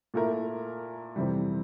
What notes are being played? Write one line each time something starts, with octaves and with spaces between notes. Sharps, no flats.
A#2 A3 E4 A#4
F2 C3 E3 G3